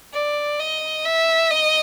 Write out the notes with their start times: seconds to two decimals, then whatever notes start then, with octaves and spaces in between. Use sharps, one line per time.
0.14 D5
0.59 D#5
1.05 E5
1.51 D#5